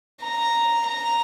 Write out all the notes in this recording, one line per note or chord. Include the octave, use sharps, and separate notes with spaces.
A#5
A#5